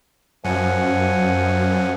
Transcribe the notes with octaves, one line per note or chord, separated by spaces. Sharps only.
F#2 F3 F#5 G#5